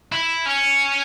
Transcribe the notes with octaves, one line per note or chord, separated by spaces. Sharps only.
E4
C#4